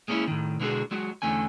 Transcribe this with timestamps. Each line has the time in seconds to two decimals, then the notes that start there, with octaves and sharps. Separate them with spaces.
0.08 G#3 A#3 C#4 D4 E4
0.27 A2 D#3
0.60 B2 D3 G#3 A3 F#4 G#4
0.91 F#3 G#3 F#4
1.22 E2 D3 A3 C#4 G#5